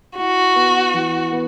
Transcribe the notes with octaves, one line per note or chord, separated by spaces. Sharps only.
E4 F#4
B3
E3
B3